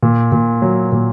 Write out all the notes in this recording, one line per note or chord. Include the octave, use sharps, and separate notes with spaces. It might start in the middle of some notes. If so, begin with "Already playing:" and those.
A#2
A#2
F#3
A#2